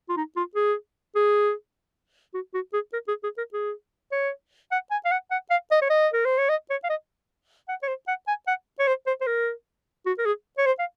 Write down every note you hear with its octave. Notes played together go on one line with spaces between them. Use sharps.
F4
D#4
F4
G#4
G#4
F#4
F#4
G#4
A#4
G#4
G#4
A#4
G#4
C#5
F#5
G#5
F5
F#5
F#5
F5
D#5
C#5
D#5
A#4
C5
C#5
D#5
C#5
F5
D#5
F#5
C#5
C5
F#5
G#5
F#5
C#5
C5
C5
C5
A#4
F#4
A#4
G#4
C#5
C5
F5